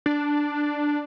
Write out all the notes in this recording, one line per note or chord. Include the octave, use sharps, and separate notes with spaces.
D4